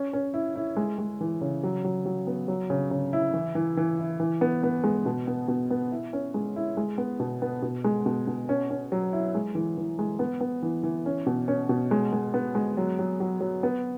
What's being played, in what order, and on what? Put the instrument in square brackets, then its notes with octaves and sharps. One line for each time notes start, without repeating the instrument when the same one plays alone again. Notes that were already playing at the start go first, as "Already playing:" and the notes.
Already playing: [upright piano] C#4
C#4
E4
E4
G#3
G#3
E3
C#3
F#3
F#3
F#3
B3
F#3
C#3
C#3
E4
E3
E3
E3
E4
E3
B3
B3
G#3
B2
B3
B2
B3
E4
C#4
G#3
E4
G#3
B3
B2
B3
B2
G#3
B2
B2
C#4
C#4
F#3
E4
G#3
E3
E3
G#3
B3
B3
E3
E3
C#4
B2
C#4
B2
G#3
G#3
B3
G#3
F#3
F#3
F#3
F#3
B3